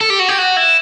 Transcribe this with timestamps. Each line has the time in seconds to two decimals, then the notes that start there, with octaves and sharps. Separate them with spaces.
0.01 A4
0.10 G4
0.19 F#4
0.28 G4
0.38 F#4
0.56 E4